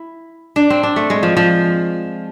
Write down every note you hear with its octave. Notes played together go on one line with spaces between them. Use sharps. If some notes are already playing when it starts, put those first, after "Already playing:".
Already playing: E4
D4
C4
D4
A3
G#3
F3
F3